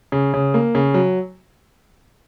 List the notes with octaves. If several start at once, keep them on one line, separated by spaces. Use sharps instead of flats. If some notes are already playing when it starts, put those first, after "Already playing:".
C#3
C#3
A#3
C#3
F#3